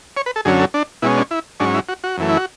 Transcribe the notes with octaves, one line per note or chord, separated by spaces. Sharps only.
C#5
B4
A4
F#2 D3 F#3 C#4 G#4
A4
D4
B2 G#3 C#4 E4
D4
E4
G#2 F#3 C#4 D4
E4
F#4
F#4
F#2 E3 A3
E4
F#4